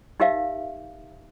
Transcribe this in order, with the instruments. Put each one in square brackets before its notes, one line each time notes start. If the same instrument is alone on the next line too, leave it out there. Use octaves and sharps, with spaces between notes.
[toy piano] D#4 G4 A#4 E5 F5